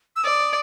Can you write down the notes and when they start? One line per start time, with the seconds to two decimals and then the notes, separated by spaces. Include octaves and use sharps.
0.16 E6
0.23 D5 D#6